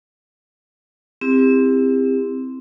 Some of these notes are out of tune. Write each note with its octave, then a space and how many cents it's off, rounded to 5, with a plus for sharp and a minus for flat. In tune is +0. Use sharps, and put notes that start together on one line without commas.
C4 +0 E4 +0 G4 +40